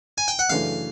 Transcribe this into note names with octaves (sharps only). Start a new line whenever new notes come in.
G#5
G5
F#5
F#2 C#3 E3 A3 D4 F5